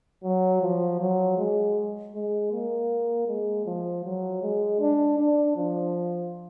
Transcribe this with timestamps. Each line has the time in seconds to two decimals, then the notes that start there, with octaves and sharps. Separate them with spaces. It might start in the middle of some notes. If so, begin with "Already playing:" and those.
0.24 F#3
0.62 F3
1.00 F#3
1.38 G#3
2.15 G#3
2.52 A#3
3.28 G#3
3.66 F3
4.05 F#3
4.42 G#3
4.80 D4
5.18 D4
5.56 F3